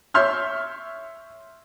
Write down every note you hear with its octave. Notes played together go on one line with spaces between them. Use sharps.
C#5 E5 C6 F6 G6